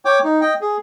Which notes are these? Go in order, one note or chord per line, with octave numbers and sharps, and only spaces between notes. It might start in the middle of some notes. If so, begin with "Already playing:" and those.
C#5 G5 D6
D#4
D#5 G5
G#4